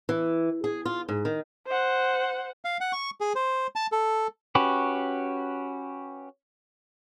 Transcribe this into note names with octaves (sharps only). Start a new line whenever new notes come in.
E3
G#4
F4
G#2
D#3
C5 F#5
F5
F#5
C#6
G#4
C5
A5
A4
C#4 F#4 G4 B4